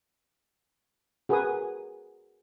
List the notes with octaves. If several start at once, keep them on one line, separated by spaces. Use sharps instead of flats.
F#4 G#4 A#4 B4 G#5 D#6